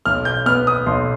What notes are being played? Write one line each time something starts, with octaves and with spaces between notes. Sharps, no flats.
B1 F6
G6
B3 F6
D#6
B1 C6